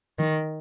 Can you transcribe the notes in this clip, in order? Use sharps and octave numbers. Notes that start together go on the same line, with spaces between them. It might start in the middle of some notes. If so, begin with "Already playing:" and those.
D#3